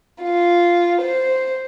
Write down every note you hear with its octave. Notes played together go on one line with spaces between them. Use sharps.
F4
C5